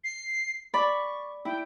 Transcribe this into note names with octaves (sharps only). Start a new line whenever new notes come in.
C7
D5 B5 C#6
E4 G5